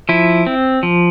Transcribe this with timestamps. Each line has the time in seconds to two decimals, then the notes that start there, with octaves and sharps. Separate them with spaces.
0.09 F3 E4
0.47 C4
0.83 F3